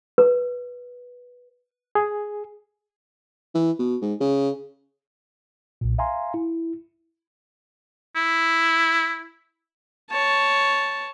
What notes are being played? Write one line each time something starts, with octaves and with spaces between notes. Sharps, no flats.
B4
G#4
E3
B2
G#2
C#3
B1 A#2
E5 F5 G#5 A#5 C6
E4
E4
C#5 A5